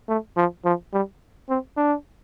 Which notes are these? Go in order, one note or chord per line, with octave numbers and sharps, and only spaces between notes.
A3
F3
F3
G3
C4
D4